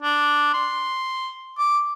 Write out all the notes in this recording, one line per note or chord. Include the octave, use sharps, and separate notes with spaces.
D4
C6
D6